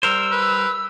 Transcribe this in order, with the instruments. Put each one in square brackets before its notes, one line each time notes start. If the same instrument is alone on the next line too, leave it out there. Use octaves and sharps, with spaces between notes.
[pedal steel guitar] G3 A#4 C5 [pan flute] E6
[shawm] B4